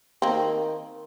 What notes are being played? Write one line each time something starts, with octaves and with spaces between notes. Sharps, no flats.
D#3 A#3 C4